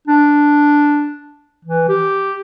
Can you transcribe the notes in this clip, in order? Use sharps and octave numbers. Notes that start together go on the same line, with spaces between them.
D4
E3
G4